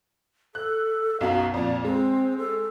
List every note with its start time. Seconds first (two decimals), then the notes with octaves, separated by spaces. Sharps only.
0.55 A4 F#6
1.21 B1 F#2 B2 F5
1.54 F2 A#2 D5
1.84 G#3 C4
2.38 A4